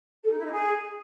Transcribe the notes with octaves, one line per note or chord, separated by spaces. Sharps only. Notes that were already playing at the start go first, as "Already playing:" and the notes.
A4
D#4
E4
D#4
G#4